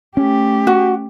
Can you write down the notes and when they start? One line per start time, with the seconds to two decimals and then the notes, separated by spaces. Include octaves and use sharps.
0.17 A3 C#4 G4
0.67 F#4